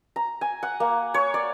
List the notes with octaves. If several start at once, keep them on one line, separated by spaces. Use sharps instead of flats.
A#5
G#5
F#5
A#3
C#5
D5